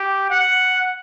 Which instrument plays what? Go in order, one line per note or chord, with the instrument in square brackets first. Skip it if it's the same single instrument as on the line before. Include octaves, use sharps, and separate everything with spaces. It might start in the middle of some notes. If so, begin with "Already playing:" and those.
Already playing: [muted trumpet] G4
F#5